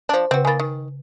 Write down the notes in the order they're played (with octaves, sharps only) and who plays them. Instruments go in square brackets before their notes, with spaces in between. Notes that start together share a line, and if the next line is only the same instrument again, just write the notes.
[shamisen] F3 D4 [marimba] C5 A5 D6
[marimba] C#3 B4 [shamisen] C4 F#4
[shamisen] D#3 A#3 [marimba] G#5 B5 A6
[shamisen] D#3